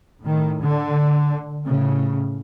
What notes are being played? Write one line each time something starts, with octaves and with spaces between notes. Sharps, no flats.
A2 D#3
D3
A2 C#3